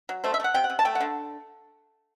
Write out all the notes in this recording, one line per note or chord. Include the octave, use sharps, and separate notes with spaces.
F#3
A3 C5
E5
A3
F#5
C3 G5
F#5
C3
A5
A3 G5
F#5
D3